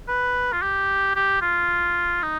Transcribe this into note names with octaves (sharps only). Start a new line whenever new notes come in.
B4
F4
G4
G4
F4
D#4